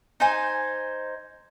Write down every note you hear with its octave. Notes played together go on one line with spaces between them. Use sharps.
D#4 C5 G#5